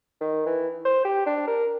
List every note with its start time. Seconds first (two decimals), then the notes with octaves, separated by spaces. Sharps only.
0.21 D#3
0.46 E3
0.85 C5
1.05 G4
1.26 D4
1.47 A#4